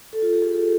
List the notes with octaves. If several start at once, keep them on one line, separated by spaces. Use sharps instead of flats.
A4
F4
G4
G#4
A4